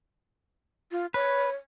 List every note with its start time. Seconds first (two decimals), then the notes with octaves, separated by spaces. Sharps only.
0.92 F4
1.14 B4 C#5